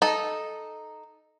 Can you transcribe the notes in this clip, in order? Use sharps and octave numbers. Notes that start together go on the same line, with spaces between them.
D#4 A4